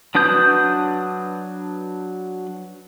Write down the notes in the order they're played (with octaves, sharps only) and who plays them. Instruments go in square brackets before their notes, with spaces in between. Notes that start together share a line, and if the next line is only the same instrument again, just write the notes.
[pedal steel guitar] F#3 D4 B4 D#6 G6